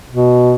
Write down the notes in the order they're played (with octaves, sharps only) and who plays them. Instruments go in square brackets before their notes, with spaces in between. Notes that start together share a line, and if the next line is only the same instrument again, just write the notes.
[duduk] B2